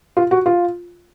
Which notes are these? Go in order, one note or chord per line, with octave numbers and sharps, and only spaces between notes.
F4
F#4
F4